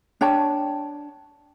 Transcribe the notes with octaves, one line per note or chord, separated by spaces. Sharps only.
D4 C#5 G5 A5